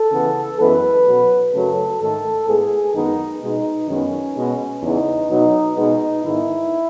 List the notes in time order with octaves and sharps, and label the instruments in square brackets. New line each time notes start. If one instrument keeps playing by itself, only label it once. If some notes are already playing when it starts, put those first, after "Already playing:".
Already playing: [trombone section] A4
C#3 E3 B3
F#2 E3 G#3 B3 B4
B2 F#3 B3
F#2 C#3 F#3 A3 A4
G#2 D#3 A3 A4
A2 G#3 B3 G#4
F#2 D#3 G#3 B3 D#4
B2 G#3 B3 D#4
F#2 D#3 G#3 B3 C#4
B2 G#3 B3
E2 C#3 E3 B3 D#4
B2 F#3 B3 D#4
B2 G#3 B3 D#4
G#2 D#3 G#3 B3 E4